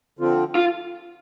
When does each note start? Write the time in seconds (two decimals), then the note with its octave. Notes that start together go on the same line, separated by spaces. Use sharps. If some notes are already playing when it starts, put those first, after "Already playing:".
0.19 D3 F3 C4 F4
0.55 F4